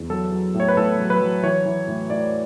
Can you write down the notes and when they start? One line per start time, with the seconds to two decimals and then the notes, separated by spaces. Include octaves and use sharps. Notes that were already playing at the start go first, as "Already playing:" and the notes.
Already playing: E2
0.10 F#3 A4
0.32 F#3
0.54 A2
0.60 C#5
0.68 B4
0.77 A2 A4
0.99 F#3
1.10 B4
1.21 F#3
1.43 E3 C#5
1.66 E3
1.88 A2
2.10 A2 D5